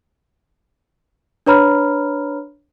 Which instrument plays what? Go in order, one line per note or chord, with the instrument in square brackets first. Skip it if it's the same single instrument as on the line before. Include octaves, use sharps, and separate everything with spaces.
[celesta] D4 B4 C#5 A#5 B5 F6